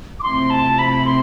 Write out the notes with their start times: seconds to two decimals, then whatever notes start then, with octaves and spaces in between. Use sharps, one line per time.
0.20 D6
0.23 C3 F3 A3 C4 E4 C6
0.50 A5
0.79 B5
1.06 C6